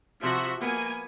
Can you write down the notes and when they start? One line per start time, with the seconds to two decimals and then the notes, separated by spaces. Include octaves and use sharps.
0.23 C3 F3 F#4 E5
0.61 A#3 B3 G#5